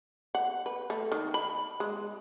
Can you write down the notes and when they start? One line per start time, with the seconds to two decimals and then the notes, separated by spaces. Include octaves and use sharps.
0.35 F#5
0.66 B4
0.90 A3
1.12 D#3
1.34 B5
1.80 G#3